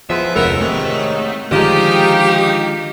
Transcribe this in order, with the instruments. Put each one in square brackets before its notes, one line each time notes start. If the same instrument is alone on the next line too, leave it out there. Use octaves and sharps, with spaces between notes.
[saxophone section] E2 G#3 B3 [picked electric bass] F3 [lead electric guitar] E5
[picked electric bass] F1 D2 G#3 [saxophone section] B3 A4 A#4 [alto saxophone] C#5
[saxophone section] G#2 D#3 [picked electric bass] C3 [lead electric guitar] A3
[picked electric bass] D3 D#3 G#3 [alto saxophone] F3 [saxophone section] G4 [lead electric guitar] D#5 A#5